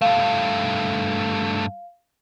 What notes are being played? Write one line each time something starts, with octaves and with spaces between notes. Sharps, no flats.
G2 A3 F5